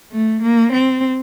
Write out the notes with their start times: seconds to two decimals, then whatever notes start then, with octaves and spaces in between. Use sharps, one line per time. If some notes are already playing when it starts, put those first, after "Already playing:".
0.12 A3
0.43 A#3
0.73 C4